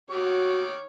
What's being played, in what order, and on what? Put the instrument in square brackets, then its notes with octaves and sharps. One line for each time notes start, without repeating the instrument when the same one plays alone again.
[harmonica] D#3 D6 [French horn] F#4 [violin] C#5